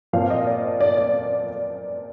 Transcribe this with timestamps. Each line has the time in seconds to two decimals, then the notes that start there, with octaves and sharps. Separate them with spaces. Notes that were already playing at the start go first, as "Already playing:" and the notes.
0.13 A#2 F3 C4 F5
0.30 D#5
0.47 D5
0.80 D5
0.97 D5